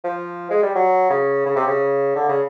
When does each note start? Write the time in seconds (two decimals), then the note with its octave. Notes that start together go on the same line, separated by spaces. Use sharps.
0.04 F3
0.50 G#3
0.63 G3
0.75 F#3
1.10 C#3
1.46 C#3
1.56 C3
1.67 C#3
2.15 D3
2.29 C#3